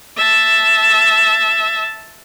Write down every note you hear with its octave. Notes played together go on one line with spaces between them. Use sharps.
E5 A5